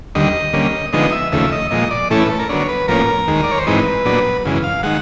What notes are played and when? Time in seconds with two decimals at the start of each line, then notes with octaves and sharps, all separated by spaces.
0.15 D#2 D3 G3 D#5
0.53 D3 G3 A#3 C#4
0.93 D3 F3 G#3 B3 D#4 D#5
1.12 E5
1.32 D#2 C#3 F3 A3 E5
1.52 D#5
1.71 A#2 F3 G#3 D#5
1.91 D5
2.10 A2 E3 A3 C#4 E4 A4
2.20 B4
2.30 A4
2.39 A#4
2.49 D3 F#3 B3 D4 C#5
2.69 B4
2.88 A2 F3 A#3 C#4 A#4
3.27 D#2 D#3 G#3
3.43 D5
3.51 C#5
3.58 C5
3.67 G#2 E3 G#3 C4 D#4 B4
4.05 A#2 F#3 B3 D4
4.45 F#2 C#3 E3 G#3
4.64 F5
4.83 D#3 G#3 F#5